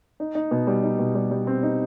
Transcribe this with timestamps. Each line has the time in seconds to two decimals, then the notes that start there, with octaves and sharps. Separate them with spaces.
0.20 D#4
0.35 D#4
0.51 B2
0.67 G3
0.83 D#4
0.99 B2
1.15 G3
1.31 G3
1.47 C4
1.63 D#4